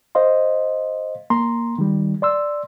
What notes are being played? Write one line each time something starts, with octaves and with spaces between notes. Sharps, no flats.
C5 D#5 F5 C6
A#3 A#5 C6
D#3 G3
D5 C6 E6